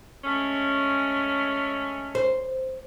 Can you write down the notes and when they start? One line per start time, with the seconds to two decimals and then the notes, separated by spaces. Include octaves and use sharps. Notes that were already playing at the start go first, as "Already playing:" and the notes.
0.25 G#3 A3 C#4
2.15 C5